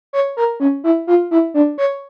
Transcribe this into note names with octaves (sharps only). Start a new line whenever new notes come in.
C#5
A#4
C#4
E4
F4
E4
D4
C#5